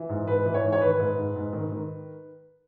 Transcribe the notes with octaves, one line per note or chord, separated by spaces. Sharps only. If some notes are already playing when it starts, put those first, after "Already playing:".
Already playing: E3
G#2
G#2 B4
E3
C#5
G#2
C#5
D#3 B4
G#2
G#2
G#2
D#3
D#3